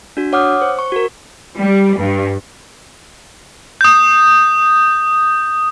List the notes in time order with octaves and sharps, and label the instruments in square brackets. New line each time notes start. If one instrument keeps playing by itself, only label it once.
[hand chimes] D4 F#4
C#5 F#5 D6 D#6 F6
C5
C#6
F#4 A#4
[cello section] G3
G2
[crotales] D#6 G6